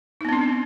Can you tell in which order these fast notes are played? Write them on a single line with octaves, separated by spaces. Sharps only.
D#4 B3 C4 D4